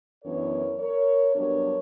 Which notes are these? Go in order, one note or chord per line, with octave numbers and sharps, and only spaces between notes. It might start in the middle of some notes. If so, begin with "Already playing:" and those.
F#2 E3 B3 D4 A#4 C#5
A#4 C#5
G2 F#3 B3 D4 A#4 C#5